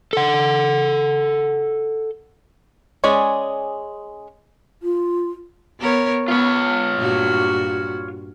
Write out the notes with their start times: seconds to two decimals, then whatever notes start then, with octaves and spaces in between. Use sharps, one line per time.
0.13 A4 F#5
3.04 G#3 C#4 G#4 D5
4.83 F4
5.79 B3 A#4 C#5
6.28 B3 F4 C#5
6.96 G2 A#2 F#4